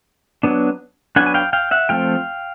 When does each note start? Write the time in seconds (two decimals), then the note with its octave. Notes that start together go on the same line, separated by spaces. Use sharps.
0.43 F#3 B3 D4
1.16 F#3 B3 D4 F#5 G#5
1.26 G#5
1.34 F5 G5
1.53 F5 G5
1.71 E5 F#5
1.89 F3 A3 C4 F5 G5